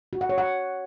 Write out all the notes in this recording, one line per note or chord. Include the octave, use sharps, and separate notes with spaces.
F#4
F#5
C#5
F#5